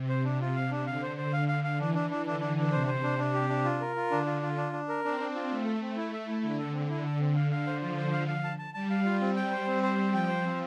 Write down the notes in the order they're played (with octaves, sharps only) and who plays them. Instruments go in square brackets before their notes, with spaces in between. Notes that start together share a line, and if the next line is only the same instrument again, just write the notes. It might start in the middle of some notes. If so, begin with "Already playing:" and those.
Already playing: [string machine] C3
[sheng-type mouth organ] C5
D4
[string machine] C3 [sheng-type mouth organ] F4
[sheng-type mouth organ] F5
D4
[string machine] D3 [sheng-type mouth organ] F5
[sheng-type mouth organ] C5
C5
F5
F5
F5
[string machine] E3 [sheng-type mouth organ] D4
[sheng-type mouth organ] D4
D4
[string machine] D3 [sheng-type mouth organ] D4
[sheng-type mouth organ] D4
D4
[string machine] C3 [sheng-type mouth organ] C5
[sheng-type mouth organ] C5
D4
D4
G4
D4
F4
A#4
F4
[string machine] D3 [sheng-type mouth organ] D4
[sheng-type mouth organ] F4
F4
D4
D4
A#4
[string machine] C4 [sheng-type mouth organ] D4
[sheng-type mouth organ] D4
F4
[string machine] A3 [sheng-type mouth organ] C4
[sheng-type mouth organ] A4
C4
E4
E5
E4
[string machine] D3 [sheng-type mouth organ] E4
[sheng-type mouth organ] A4
C4
[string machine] D3 [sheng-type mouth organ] E4
[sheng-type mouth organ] A4
C4
[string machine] D3 [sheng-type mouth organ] F5
[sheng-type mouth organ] F5
C5
[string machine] F3 [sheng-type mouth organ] F4
[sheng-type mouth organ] C5
F5
F5
A5
A5
[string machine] G3 [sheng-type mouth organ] A5
[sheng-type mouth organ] F5
F4
[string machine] G3 [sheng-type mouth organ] C4
[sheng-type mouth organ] G5
C5
[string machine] G3 [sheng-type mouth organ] C4
[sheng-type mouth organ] C5
C4
[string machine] F3 [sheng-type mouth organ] G5
[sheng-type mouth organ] C5
C4